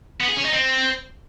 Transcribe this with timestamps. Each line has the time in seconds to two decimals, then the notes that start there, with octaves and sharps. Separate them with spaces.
0.20 B3
0.29 G#4
0.37 C#4
0.45 D#4
0.53 C4